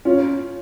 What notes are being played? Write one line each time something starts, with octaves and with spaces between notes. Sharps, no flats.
C#4 F4